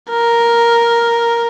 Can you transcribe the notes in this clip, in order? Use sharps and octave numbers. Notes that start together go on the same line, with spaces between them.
A#4